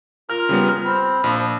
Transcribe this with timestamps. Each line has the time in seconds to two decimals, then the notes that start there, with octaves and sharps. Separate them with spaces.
0.30 F4 A#4 F6
0.49 C#3 G3 B3
0.69 F6
0.85 C4 B5
1.24 A#1 F3